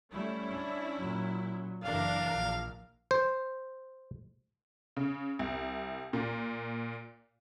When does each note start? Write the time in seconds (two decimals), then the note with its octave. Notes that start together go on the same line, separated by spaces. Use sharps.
0.12 G3 A3 C#4 E4
0.51 D4
0.98 A#2 F#3
1.84 F#1 E3 D4 A#4 F5
2.33 A#1
3.11 C5
4.97 C#3
5.39 C2
6.13 A#2